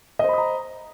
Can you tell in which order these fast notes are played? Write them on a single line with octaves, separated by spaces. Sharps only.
D#5 C5 B5 D#6 A#5